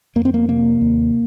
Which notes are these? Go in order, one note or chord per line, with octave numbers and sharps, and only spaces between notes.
F2 A#3
C4
A#3
C3 A#3
D#2